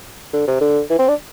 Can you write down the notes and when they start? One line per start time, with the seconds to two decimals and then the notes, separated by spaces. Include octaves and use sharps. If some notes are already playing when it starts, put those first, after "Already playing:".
0.33 D3
0.47 C3
0.61 D3
0.90 E3
0.99 C4
1.08 D4